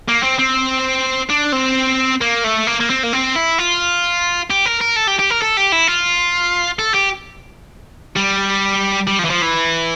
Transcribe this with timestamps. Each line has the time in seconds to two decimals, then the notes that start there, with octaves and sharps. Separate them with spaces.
0.08 A#3
0.23 C4
0.38 C4
1.30 D4
1.53 C4
2.21 A#3
2.44 A3
2.67 A#3
2.80 A#3
2.90 C4
3.03 A#3
3.13 C4
3.36 E4
3.58 F4
4.50 G4
4.65 A#4
4.81 A#4
4.96 A4
5.07 G4
5.19 G4
5.30 A#4
5.42 A4
5.57 G4
5.72 E4
5.88 F4
6.79 A4
6.94 G4
8.16 G3
9.07 G3
9.19 F3
9.25 E3
9.30 F3
9.42 E3